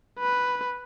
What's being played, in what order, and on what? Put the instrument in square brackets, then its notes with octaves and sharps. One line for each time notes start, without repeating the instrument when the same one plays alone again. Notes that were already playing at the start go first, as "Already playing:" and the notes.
[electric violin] B4